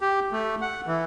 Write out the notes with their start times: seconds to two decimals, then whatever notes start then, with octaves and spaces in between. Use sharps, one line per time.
0.01 G4
0.32 A3
0.61 F#5
0.87 E3